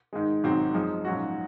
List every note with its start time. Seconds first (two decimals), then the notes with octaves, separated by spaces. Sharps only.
0.13 G#2 D#3 G#3
0.43 G#1 G#2 D#3 F#3 C4
0.74 F#2 F3 G#3 D#4
1.05 A#1 G#2 F#3 C#4 F#4